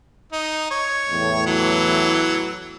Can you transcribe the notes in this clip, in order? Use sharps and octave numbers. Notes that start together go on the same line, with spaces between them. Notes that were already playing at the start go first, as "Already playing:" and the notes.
D#4
C#5
E2 A2
E3 F#3